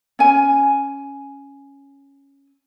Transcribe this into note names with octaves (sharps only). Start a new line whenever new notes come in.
C#4 G#5